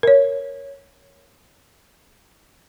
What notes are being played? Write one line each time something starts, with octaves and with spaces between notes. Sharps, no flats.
A#4 C#5